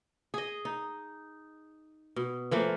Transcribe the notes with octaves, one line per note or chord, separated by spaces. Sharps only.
G#4 D#5
D#4
B2
E3 F3 A3 A#3